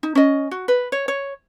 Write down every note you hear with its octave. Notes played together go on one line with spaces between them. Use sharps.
D#4
C#4 D#5
F#4
B4
C#5
C#5